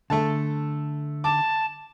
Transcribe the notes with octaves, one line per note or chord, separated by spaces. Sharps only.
D3 A3 A4 A5
A5 D6